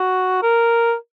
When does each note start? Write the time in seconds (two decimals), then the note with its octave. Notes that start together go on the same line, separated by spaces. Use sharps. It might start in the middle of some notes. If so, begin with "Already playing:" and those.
Already playing: F#4
0.43 A#4